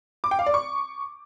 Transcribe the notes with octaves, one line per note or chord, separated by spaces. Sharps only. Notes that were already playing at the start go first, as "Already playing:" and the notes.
D6
G5
F5
D5
C#6